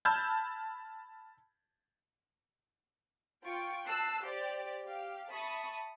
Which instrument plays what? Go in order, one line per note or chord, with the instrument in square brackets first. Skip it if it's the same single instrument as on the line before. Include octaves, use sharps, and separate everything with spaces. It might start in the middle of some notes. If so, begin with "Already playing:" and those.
[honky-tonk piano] A5 B5 E6 F6 G6 G#6
[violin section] F4 G5 C#6 D7
A5 E6 F#6 C7
G4 C5 D5
G4 F5
E5 A5 B5 C#6 D#6